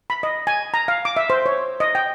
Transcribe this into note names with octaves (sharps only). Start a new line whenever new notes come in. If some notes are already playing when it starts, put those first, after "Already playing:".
B5
D#5
G#5
A#5
F5
D6
E5
C5
C#5
D#5
G5